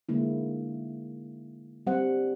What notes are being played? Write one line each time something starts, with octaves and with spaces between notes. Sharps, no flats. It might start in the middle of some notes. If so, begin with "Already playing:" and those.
D3 G#3 A#3 E4
G3 C4 C5 F#5